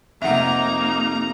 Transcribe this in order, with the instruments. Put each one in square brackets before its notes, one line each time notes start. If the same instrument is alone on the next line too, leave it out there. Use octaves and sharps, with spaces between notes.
[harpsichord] F2 C3 [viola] A#3 D#4 [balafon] E5 F#5 [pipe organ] A#5